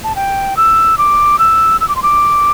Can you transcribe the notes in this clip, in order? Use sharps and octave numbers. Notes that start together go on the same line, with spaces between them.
A5
G5
E6
D6
E6
E6
D6
C6
D6